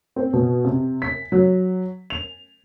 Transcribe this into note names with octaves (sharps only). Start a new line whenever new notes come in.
C4
B2
C3
B6
F#3
F7